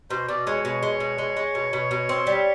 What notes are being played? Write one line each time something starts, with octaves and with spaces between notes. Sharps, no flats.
B2 C5
B2 D5
G#3 C#5
B2 C#5
G#3
B2
G#3
G#3
B2
B2
B2
C4
G3